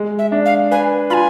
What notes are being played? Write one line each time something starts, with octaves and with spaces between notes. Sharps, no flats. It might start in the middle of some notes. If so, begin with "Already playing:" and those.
Already playing: G#3
E5
D4
F5
B4 G#5
F4 G#5 B5